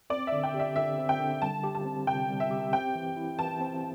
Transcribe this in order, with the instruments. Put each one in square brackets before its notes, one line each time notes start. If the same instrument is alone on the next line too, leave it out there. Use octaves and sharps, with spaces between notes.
[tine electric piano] C4 [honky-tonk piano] D5
[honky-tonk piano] E5
[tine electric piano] D3
[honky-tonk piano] G5
[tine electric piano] G4
[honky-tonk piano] E5
[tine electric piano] D3 [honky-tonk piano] E5
[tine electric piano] C4
[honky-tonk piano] G5
[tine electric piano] D3
[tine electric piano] G3 [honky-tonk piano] A5
[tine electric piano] G4
[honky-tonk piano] A5
[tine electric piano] C4
[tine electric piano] C3 [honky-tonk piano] G5
[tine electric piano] G3
[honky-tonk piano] E5
[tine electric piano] G4
[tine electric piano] C4 [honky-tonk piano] G5
[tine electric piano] E3
E4
[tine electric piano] E3 [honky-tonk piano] A5
[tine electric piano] C4